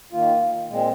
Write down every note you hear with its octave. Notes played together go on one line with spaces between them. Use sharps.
D#3 A#3 F4
A#2 G#3 C4